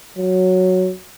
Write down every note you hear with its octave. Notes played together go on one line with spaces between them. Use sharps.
F#3